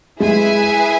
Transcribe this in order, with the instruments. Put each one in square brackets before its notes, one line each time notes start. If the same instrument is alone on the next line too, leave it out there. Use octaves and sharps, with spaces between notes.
[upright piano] G#3 [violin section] E4 G#4 B4 E5 G#5